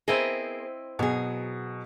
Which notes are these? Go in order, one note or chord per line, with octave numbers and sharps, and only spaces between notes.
B3 C4 E4 G#4 A#4 D#5
B2 F#3 G#4